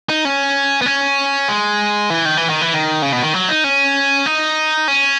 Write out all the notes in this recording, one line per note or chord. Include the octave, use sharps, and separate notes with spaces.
D#4
C#4
B3
C#4
G#3
E3
D#3
E3
D#3
E3
D#3
C#3
B2
D#3
F#3
D#4
C#4
D#4
C#4